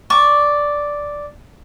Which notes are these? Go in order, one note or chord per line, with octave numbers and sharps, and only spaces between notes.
D5 C#6